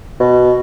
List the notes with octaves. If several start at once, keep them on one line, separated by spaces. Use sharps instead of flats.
B2